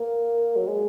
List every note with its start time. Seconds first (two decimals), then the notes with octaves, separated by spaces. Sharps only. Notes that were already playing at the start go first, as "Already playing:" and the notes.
Already playing: A#3
0.56 F#3
0.68 G#3